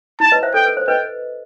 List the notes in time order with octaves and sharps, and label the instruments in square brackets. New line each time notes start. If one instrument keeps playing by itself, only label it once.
[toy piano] E4 [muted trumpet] A5
[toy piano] B4 D#5
C5 E5
[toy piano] A4 [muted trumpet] G5
[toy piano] B4
C5
[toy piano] B4 D#5 [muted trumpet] G5